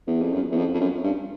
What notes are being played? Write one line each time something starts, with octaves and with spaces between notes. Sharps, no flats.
E2
F2
F#2
E2
F2
F2
F#2
G2